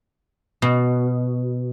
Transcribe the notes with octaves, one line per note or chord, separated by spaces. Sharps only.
B2